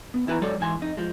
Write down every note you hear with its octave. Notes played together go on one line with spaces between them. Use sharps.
B3
E2 E4 B4 G#5 A#5
F#3 G#3 A4 C#5 D5
G#2 E3 G#5 B5 C6
F2 D#4
F3 G#3